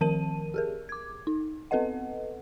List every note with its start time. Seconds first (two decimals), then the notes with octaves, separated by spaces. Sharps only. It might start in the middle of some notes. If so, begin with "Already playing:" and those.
0.01 D#3 F3 C4 A#4 A5 D#7
0.54 G4 G#4 A#4
0.89 D6 G#6
1.27 D#4
1.71 B3 C4 A4 B4 D#5 F#5